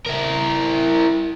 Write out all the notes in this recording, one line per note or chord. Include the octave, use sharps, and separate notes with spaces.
E4 A#4